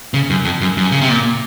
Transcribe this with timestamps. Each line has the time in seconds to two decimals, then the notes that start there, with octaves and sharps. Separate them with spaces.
0.14 C#3
0.30 F#2
0.45 F2
0.61 F#2
0.77 F#2
0.92 C#3
1.01 C3
1.09 A#2